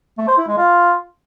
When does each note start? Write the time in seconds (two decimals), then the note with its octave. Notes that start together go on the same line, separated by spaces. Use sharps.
0.18 A3
0.28 C5
0.38 E4
0.48 G#3
0.57 F4